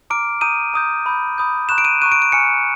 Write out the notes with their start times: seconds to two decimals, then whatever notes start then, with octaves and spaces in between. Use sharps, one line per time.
0.10 A#5 D6 F6 D7
0.41 A#5 D#6 G6 D#7
0.74 A#5 D#6 G6
1.06 B5 D#6 G6
1.38 B5 D#6 G6
1.69 A#5 C#6 F#6 E7
1.78 D7
1.85 D#7
2.01 A#5 C#6 F#6 D#7
2.12 D7
2.22 D7
2.32 G#5 C#6 F6 C#7